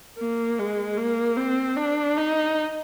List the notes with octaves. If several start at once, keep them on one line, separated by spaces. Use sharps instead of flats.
A#3
G#3
A#3
C4
D4
D#4